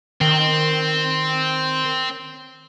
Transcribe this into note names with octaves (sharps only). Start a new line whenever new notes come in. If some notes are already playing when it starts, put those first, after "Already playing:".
D#3 C4